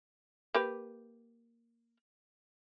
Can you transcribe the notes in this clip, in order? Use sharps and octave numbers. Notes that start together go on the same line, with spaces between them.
A#3 G4 B4